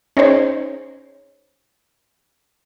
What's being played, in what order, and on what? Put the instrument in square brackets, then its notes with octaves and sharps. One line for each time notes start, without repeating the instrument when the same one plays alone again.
[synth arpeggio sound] C#4 D#4 G#4 C5 C#5